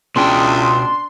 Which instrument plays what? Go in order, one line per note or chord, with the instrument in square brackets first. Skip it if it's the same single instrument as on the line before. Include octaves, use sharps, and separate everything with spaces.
[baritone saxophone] C#2 [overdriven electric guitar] B2 G5 [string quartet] D4 [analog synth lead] C6